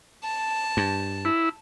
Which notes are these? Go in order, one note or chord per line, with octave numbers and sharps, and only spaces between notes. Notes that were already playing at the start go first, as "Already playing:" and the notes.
A5
G2
E4